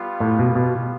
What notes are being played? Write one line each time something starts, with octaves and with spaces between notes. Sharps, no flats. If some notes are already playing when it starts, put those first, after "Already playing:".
Already playing: G3 B3 F4
A2
B2
B2